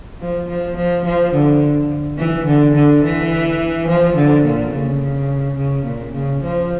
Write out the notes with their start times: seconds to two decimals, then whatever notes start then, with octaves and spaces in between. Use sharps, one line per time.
0.21 F3
0.49 F3
0.77 F3
1.05 F3
1.34 D3
2.18 E3
2.46 D3
2.74 D3
3.03 E3
3.89 F3
4.16 D3
4.45 A#2
4.73 C#3
5.57 C#3
5.85 A#2
6.14 C#3
6.43 F3